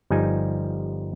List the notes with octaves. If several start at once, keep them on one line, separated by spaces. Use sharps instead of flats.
G1 F3 G3 D#4 G#5